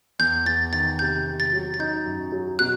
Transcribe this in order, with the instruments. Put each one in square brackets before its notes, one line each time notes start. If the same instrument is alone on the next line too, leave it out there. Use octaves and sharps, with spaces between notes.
[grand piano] E2 [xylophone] G6
[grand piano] E2 [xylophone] A6
[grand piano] D#3 [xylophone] A6
[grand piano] C3 [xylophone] G6
[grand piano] C3
[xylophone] A6
[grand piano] F#3
[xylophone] A6
[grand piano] D#4 [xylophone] G6
[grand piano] F#2
F#3
[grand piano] B2 [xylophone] F#6